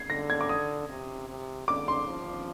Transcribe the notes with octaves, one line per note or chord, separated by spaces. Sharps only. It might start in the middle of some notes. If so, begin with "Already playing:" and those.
Already playing: G#6 C7
D3 A#6
G#6
D6
D#6
C3
C3
D3 D6
C6
F3